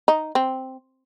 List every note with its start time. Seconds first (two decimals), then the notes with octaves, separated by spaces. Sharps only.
0.08 D#4
0.35 C4